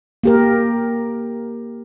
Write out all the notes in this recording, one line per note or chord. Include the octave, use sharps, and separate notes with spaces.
A#3 G4 A#4